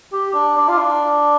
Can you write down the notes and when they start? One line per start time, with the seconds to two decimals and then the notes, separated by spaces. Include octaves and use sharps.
0.12 G4
0.34 D4
0.57 D4
0.68 F4
0.78 D4